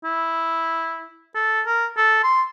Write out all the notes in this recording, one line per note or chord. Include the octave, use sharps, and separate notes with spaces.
E4
A4
A#4
A4
C6